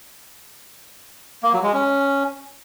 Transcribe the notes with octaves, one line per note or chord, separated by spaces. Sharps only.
A#3
F#3
G#3
C#4